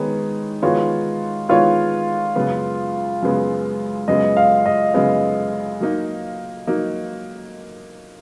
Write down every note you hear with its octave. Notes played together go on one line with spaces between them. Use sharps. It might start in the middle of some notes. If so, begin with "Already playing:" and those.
Already playing: D#3 G#3 B3 D#4 C#5
D#3 G#3 B3 F4 F#4 C#5
D#3 G#3 B3 F4 F#4 C#5
F#2 C#3 G#3 B3
F#2 C#3 G#3 B3
F#2 C#3 G#3 B3 D#5
F5
D#5
F#2 C#3 G#3 B3 D#5
F#3 A#3 D#4
F#3 A#3 D#4